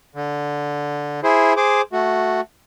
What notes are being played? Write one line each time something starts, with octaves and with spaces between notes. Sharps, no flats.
D3
E4 G#4 C5
G#4 C5 D6
A3 F#4